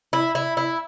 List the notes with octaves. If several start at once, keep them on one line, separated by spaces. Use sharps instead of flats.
E4
E4
E4